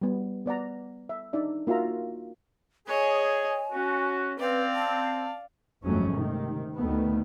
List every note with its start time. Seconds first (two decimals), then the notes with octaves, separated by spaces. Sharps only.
0.02 G3 B3
0.46 B3 D5 F#5 A#5
1.09 E5
1.33 D4 D#4 D5 E5
1.67 A#3 F4 F#4 E5 A#5
2.87 G#4 C#5 D#5 G#5
3.72 C#4 F#4
4.39 C4 B4 D5 F5
4.75 A5
5.83 G1 F2 F#3 G#3 A3 C#4
6.13 C3 D#3
6.77 D2 D#3 A3 B3